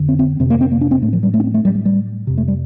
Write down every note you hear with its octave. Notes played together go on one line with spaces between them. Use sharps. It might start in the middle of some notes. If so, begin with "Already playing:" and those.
Already playing: F2 D3
C4
C4
F2 C3 C4
A#3
C4
A#3
D4
C4
A2 A3
F3
G3
A3
D4
C4
A3
A2 G3
G3
G3
F2 C3
A3
G3